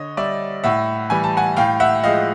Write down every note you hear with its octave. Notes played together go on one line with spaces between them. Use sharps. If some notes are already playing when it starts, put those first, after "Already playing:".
Already playing: D3 C#5 D#5
G3 D5 E5
A2 E5 F#5
E3 G3 G#5
A5
F#5 G#5
A2 F5 G5
E5 F#5
F3 G#3 D#5 F5